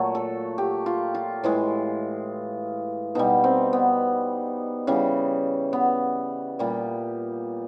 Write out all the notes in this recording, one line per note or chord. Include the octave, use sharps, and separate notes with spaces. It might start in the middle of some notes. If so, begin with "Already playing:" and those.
Already playing: A#2 F#3 A3
A4
G4
F4
F4
A2 E3 G#3
B2 G3 D#4
C4
B3
C#3 E3 G3
B3
A#2 G3